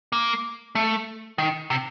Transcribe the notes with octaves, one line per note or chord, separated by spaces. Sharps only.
A#3
A3
D#3
C3